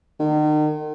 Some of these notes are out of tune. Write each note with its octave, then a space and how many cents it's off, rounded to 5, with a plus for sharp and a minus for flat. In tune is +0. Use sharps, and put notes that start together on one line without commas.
D#3 -40